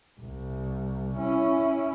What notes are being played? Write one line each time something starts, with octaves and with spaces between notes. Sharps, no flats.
C2
C#4 E4